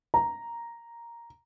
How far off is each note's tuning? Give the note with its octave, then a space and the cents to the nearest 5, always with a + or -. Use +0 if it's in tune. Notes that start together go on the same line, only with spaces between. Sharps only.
A#5 +0